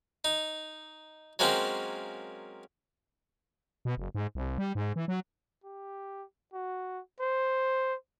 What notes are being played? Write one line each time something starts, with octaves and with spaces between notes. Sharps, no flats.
D#4
F#3 G#3 A#3 C4 C#4
B2
F#1
G#2
C2
G3
G#2
E3
F#3
G4
F#4
C5